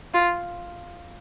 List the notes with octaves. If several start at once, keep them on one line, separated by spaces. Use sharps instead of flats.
F4